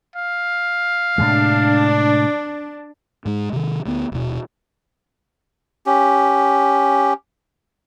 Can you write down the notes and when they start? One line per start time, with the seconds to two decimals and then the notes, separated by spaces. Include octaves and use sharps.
0.16 F5
1.18 A2 C3 G#3 D4
3.25 G#2 G#3
3.53 C3 D#3
3.85 D2 D3 B3
4.12 D#1 B2
5.86 C#4 G4